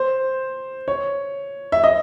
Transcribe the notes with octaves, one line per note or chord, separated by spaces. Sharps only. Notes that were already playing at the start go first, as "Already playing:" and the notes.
Already playing: C5
C#5
E5
D#5